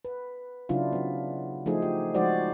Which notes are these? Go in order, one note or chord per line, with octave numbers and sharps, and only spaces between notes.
B4
C#3 F#3 D4 E4 F4
F#3 B3
F3 A3 D#4 G#4 C5
G4
F3 G#3 D#4 F#4 C5 D5